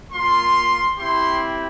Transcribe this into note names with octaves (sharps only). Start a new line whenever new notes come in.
A#3 F4 C6
C4 E4 G4 C6